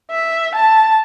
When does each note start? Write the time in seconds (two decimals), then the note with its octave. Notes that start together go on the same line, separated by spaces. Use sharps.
0.11 E5
0.55 A5